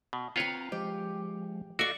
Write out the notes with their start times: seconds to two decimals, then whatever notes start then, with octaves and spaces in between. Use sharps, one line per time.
0.13 B2
0.36 C4 F4 B4 C#5 F5 G5 A#5
0.72 F3 G#3 G4
1.79 F#4 A4 D5 D#5 F5 C#6